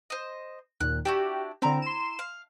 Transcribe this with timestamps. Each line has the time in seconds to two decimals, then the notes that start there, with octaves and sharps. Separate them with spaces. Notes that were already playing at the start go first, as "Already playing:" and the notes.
0.10 C5 D#5
0.80 D#2 A#2 F#6
1.05 D4 E4 F#4 G4
1.62 D3 C4 E4 A#5
1.82 C6 E7
2.19 F5